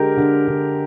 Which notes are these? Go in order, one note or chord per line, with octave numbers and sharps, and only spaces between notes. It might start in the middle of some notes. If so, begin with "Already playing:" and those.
Already playing: D3 G#3 G4 A#4
D3
D3